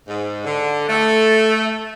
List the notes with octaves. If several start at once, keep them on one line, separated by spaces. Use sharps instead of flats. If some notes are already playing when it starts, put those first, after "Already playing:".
G#2
D3
A3